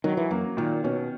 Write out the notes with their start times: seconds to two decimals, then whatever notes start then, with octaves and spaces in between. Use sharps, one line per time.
0.04 D#3 F#3
0.17 E3
0.31 F#2 A#3
0.57 A#2 D#3
0.84 B2 C#4